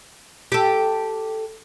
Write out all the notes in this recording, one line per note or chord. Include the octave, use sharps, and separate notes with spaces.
G4 A4